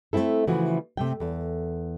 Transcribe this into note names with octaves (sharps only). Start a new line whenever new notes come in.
A3 A#3 C4 E4 A4
C#3 E3 F3 A3 E4 F#4
C3 A3 G5
E2 A4